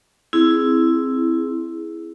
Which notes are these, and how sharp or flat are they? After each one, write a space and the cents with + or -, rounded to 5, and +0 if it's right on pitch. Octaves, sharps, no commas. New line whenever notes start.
C4 +0 E4 +0 G#4 +0